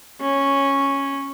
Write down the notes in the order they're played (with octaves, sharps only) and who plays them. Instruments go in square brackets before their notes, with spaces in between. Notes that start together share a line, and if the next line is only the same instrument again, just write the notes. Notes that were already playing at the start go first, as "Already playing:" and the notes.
[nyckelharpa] C#4